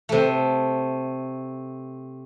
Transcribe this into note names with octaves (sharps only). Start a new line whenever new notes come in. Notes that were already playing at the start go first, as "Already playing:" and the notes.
C3 A3